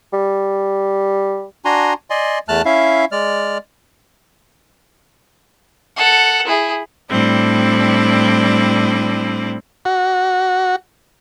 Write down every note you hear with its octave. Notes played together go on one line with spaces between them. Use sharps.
G3
D4 F#4 G#5 A#5 C6
D5 D#5 G#5 C6
E2 A3 A5 F6 F#6
C#4 E4 E5 F5
G#3 D5 F6
A4 F#5
E4 G#4
A2 G3 C4 D4 E4
F#4